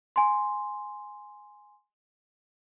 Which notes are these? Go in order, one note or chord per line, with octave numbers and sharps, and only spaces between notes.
G#5 C6